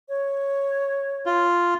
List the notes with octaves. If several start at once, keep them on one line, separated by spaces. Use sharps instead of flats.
C#5
F4